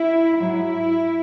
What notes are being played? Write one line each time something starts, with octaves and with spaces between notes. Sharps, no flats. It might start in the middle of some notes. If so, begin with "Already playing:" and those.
Already playing: E4
G#2 F#3 E4